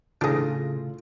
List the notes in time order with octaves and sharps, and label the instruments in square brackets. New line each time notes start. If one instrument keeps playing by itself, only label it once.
[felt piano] A2 A4 A#6 [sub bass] C#3 [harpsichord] D4 G#4 [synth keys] F4